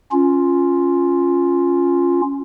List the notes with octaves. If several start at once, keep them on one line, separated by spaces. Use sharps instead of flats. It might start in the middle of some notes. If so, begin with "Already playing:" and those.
C#4 F4